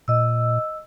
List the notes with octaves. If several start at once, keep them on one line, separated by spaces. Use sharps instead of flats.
A#2 D#5 E6